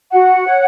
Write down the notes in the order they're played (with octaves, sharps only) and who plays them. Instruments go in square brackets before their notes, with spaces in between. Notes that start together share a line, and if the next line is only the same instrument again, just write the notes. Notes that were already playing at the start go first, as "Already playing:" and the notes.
[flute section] F#4 F#5
C#5